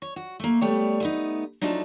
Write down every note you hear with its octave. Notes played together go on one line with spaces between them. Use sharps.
C#5
F#4
A3 A#3
G3 A3 B3 G4 C#5 D5
A3 B3 D#4
F3 F#3 A3 D4 D#4